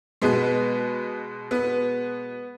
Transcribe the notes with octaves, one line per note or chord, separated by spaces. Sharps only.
B2 G#3 B3
B3